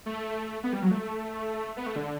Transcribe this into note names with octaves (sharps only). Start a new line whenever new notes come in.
A3
B3
G3
F#3
A3
B3
A3
D3